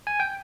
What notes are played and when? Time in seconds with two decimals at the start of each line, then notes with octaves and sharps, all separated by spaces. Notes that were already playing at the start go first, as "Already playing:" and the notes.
0.07 G#5
0.20 G5